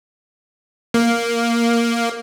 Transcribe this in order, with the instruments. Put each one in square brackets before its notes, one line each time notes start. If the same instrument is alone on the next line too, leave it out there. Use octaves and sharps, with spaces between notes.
[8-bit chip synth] A#3